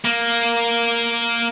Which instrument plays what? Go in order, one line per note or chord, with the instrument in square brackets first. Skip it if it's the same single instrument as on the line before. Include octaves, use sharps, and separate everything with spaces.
[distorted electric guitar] A#3